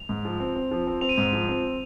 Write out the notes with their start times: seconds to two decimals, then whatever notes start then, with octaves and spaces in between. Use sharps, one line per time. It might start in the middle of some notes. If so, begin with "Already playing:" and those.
Already playing: F7
0.09 G#2
0.25 F3
0.40 C4
0.55 C4
0.71 F3
0.87 C4
1.01 C4 F7
1.09 D#7
1.16 G#2 F7
1.33 F3
1.48 C4